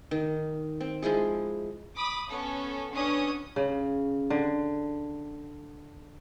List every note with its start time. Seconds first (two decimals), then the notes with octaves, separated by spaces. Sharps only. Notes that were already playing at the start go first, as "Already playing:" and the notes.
0.11 D#3
0.81 C4
1.02 F3 G#3 E4 G#4
1.96 B5 D6 D#6
2.29 B3 C#4 A4
2.91 B3 C#4 D4 D#6
3.56 C#3
4.30 D3